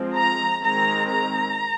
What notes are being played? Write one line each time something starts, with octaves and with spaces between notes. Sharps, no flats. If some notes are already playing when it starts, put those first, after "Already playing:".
Already playing: F3 G#3 C4
A#5
D#3 G#3 C4 A#5
A#5